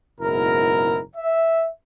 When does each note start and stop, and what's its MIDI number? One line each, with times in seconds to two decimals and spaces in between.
0.20 0.99 30
0.20 0.99 44
0.20 0.99 47
0.20 0.99 64
0.20 0.99 70
1.15 1.68 76